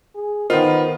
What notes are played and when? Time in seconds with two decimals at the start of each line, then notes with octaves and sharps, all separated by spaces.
0.15 G#4
0.50 D#3 B3 F4 A#4 C5 D#5